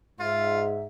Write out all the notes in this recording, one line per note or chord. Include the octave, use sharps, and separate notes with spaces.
G#2 F4 E5